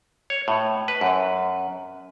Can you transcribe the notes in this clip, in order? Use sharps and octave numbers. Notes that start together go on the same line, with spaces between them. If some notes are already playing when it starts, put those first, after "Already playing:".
C#5
A2
B4
F#2